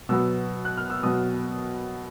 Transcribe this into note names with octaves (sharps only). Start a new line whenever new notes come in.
B2 F#3 B3 E6
F#6
F6
E6
B2 F#3 B3 D#6